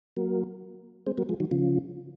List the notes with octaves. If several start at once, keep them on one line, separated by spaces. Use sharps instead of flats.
F#3 A#3
G#3 C4
F#3 A#3
F3 G#3
D#3 F#3
C#3 F3